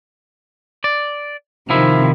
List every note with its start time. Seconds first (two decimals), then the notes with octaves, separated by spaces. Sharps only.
0.84 D5
1.70 C3 D#3 F3 E4